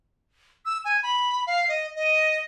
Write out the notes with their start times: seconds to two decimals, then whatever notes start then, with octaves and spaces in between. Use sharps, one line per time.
0.66 E6
0.85 G#5
1.03 B5
1.47 F5
1.69 D#5
1.96 D#5